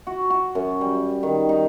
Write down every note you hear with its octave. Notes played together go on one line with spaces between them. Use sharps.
F#4
F#4
F#2
G3
D#3
D#4